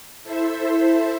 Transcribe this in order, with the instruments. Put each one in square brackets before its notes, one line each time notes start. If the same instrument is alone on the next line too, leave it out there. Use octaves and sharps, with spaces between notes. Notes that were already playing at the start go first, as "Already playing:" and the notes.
[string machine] E4 A4 C5 E5